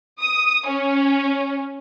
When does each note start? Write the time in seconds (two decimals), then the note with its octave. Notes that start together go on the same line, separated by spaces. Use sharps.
0.20 D#6
0.68 C#4